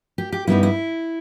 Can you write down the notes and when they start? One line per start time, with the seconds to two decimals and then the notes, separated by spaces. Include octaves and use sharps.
0.18 G4
0.32 G4
0.47 G2 G3 B3 D#4 E4
0.63 E4